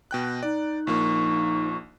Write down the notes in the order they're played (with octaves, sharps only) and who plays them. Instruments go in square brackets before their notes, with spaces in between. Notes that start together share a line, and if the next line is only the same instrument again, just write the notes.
[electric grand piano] B2 G5 F#6
[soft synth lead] D#4 [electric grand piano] D5
[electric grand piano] A#1 F3 A#3 [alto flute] C#6